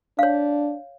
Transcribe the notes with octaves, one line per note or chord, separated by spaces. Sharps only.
D4 C#5 F5